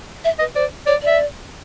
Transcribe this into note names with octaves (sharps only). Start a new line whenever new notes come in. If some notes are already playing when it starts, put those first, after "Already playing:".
E5
B4 D#5
C5 D5
C#5 D5
D5 E5